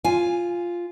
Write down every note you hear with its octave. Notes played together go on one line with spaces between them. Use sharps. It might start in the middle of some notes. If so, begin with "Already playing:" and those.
F4 G#5